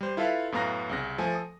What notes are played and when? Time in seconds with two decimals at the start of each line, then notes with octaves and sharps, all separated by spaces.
0.01 G3 C5
0.17 E4 F4 A4 B4 E5 F5
0.52 F#2 A2 B3 F5 A#5 A#6
0.89 C2 C#3 A#6
1.18 F3 A3 A4 G#5
1.35 D#6